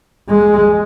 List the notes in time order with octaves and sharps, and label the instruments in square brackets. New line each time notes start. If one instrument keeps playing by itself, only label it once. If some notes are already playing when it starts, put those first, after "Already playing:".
[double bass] G#3